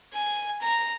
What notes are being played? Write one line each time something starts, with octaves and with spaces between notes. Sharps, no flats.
G#5
A#5